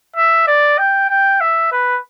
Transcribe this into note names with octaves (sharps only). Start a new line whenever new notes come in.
E5
D5
G5
G5
E5
B4